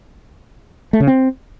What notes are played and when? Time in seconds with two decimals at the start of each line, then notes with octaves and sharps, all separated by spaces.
0.93 A3
1.00 C#3
1.07 C4